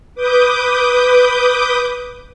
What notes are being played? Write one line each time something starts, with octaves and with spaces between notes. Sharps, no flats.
B4 D6 D#6 G6